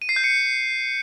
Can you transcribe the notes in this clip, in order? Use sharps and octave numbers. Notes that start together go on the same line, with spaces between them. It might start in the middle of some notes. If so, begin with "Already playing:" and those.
D#7
C7
G6
C#7